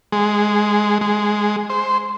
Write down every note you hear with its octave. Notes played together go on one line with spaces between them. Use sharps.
G#3
G#3
C5